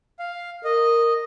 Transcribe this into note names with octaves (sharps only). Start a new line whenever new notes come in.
F5
A#4 D#5